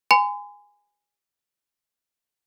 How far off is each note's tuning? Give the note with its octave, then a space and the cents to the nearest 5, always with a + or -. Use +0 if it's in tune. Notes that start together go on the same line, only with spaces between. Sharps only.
G#5 -10 C6 -45